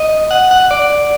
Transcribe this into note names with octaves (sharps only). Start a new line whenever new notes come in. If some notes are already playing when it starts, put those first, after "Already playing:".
Already playing: D#5
F#5
F#5
D5